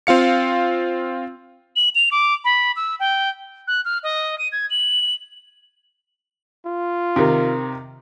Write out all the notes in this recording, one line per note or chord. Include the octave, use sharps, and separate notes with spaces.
C4 F4 F5 C#7
F#7
F7
D6
B5
E6
G5
F#6
F6
D#5
D#7
G#6
F#7
F4
C3 D#3